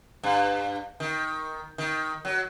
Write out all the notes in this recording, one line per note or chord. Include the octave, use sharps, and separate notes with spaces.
G2
D#3
D#3
F#3